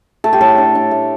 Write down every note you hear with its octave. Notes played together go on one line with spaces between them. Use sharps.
A3 A4
G4
A2 A4
D4
D4
A3